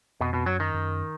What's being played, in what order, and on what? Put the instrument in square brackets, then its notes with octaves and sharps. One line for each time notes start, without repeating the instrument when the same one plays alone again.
[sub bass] F2 [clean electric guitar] B2
[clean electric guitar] B2
[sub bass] F#2 [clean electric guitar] F#3
[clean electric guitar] D#3
[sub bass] F#2